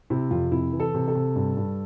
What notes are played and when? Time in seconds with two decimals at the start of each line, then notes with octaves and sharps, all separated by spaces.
0.10 C3 E4
0.31 F2 F4
0.52 C3 E4
0.73 E3
0.80 A4
0.94 C3
1.08 A4
1.15 C3
1.36 G2
1.57 G2